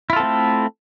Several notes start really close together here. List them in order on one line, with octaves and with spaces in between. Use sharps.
E4 F4 A4 C4 A3